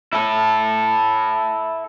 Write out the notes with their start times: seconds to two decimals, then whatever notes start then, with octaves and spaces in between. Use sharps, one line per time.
0.13 E4 A4